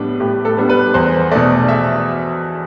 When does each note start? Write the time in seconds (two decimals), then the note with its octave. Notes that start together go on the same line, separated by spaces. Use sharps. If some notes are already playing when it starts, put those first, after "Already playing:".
Already playing: A2 G3 B3 D4 B4
0.20 A2 G4
0.45 A4
0.57 G3 B3 D4
0.69 B4
0.94 E2 C5
1.31 B2 A3 D5
1.68 E5